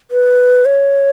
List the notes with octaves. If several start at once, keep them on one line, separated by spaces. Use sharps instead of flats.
B4
C#5